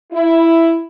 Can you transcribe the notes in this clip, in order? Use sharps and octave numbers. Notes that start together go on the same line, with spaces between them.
E4